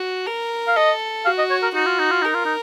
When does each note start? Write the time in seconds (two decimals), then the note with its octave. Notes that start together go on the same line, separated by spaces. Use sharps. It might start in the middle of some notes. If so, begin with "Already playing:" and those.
Already playing: F#4
0.26 A#4
0.68 F5
0.76 A4 D#5
1.25 F#4 F5
1.38 D#5
1.50 C#5
1.62 A#4
1.75 D#4 F#4
1.86 F4
1.99 D#4
2.11 F4
2.22 D#4 A#4
2.34 F4
2.45 D#4